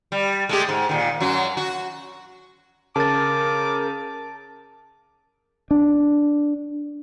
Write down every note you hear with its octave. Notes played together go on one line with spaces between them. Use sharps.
G3
G#3 A3 G4
G#2
A#2 D#3
F#2 F#3 F#4
F#4
C#3 A#4 A5 D6 A6
D4